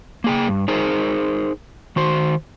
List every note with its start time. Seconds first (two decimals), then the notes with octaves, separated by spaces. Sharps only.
0.24 A#3 G#4 G5
0.47 G2
0.68 D#4 G#4 A#4 C5
1.96 D#3 F#4 C5